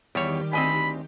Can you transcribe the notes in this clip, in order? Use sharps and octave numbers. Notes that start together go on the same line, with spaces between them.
E2 D#3 G3 G4 C#5
D2 C4 D#5 G#5 B5